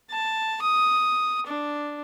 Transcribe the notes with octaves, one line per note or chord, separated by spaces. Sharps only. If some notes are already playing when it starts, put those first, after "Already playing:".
A5
D#6
D4